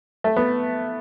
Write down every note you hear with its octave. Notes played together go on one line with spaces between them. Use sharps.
A3
B3